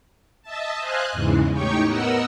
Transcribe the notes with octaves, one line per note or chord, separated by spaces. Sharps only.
D#5 E5 A5
C5 D#5 F5 G#5 F#6
E2 G#2 C#3 E3 G#3
A2 D#4 G4 C#5 G5 C#6
B3 A#4 D#5 F#5 E6